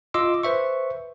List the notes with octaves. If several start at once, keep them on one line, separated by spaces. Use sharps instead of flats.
F4 D#5 C6 D6 E6
B4 C5 E5 C#6